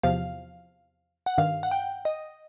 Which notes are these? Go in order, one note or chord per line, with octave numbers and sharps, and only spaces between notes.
E2 C3 F3 F5
F#5
G2 D#3 F5
F#5
G5
D#5